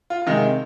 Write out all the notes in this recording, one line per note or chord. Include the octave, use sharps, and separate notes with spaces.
F4
F4
C3 D#3 G#3 D#4